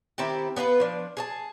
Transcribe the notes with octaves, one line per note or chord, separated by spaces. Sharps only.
D#3 C4 E4 G4
B3 D4 F4 B4
F3 D4
G#4 C#5 A5